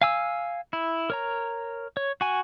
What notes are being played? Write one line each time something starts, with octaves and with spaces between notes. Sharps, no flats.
F5 G#5 E6
E4
A#4 C#5 A#5
C#5
F#4 G#5